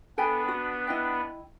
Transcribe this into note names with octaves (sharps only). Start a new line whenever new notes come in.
B3 D4 A4 B4 G5 G#5
F#4
E4 D#5 G5